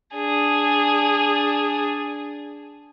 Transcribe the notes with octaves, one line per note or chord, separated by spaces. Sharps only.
D4 G#4